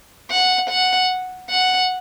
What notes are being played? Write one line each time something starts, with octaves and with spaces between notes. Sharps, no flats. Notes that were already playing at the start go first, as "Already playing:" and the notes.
F#5
F#5
F#5